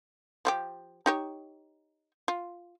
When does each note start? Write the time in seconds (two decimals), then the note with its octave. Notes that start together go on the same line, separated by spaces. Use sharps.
0.45 F3 F4 G4
1.06 D#4 G4 C#5
2.28 F4